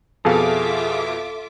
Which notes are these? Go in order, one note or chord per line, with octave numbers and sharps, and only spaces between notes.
F2 B2 F4 G#4 A4 E5 F5 D6